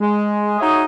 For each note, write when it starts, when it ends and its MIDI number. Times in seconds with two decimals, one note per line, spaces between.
0.01 0.56 56
0.59 0.83 63
0.59 0.83 66
0.59 0.83 68
0.59 0.83 73
0.59 0.83 75
0.59 0.83 76